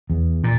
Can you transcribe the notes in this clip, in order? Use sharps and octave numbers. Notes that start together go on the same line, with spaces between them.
E2
A#2